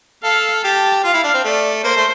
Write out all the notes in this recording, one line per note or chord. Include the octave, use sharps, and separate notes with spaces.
A4 F5
G4 A5
F4 F5
E4
D4
C4
A3 D5
A#3 C5
A3